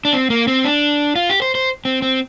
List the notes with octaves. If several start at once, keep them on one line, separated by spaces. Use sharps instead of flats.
D4
C4
A#3
C4
D4
F4
G4
C5
C5
C4
C4